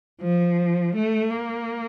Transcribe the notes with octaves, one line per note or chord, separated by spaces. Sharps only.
F3
A3
A#3